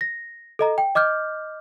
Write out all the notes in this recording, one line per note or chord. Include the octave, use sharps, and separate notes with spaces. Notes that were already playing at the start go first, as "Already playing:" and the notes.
A#6
A4 D#5 A#5
G5
D#5 D6 F6 G6